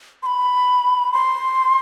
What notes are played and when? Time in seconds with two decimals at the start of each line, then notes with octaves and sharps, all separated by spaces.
0.23 C6
0.26 B5
1.12 C6